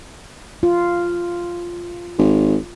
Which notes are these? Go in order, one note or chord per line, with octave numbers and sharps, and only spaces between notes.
F4
G#1